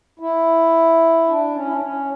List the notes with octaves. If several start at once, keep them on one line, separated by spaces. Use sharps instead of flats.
E4
D4
C#4
E4
D4
C#4